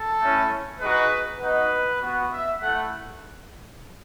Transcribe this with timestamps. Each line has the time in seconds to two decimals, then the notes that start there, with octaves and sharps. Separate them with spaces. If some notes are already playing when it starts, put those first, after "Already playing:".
Already playing: A4
0.19 A3 C#4 E4
0.80 G#3 D#4 F#4 B4
1.40 B3 D#4 F#4 B4
2.02 B3 F#4
2.32 E5
2.62 A3 E4 F#5